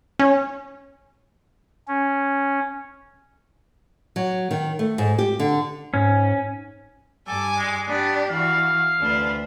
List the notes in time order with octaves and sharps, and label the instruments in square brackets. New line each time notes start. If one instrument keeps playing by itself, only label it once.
[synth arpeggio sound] C#4
[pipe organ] C#4
[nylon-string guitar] F#3
D#3
A3
G#2
G4
D3
[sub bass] G#2 [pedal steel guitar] C#4
[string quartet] G2 G#5 D6 [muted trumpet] A4
[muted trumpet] G#3
[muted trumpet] B3 [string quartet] D4 G4
[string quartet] E3 F#4 [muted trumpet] F5
[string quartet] D2 D4 B4